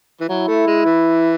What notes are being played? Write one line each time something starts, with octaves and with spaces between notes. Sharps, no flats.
E3
F#3 E4
A3
G#3
E3